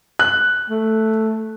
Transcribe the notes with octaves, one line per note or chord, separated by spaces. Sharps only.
F#6
A3